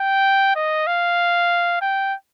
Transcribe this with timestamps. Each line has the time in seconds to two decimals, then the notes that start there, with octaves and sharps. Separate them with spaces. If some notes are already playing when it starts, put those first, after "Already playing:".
Already playing: G5
0.56 D#5
0.87 F5
1.82 G5